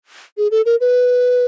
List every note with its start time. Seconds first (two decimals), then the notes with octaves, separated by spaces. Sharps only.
0.38 G#4
0.51 A4
0.66 A#4
0.81 B4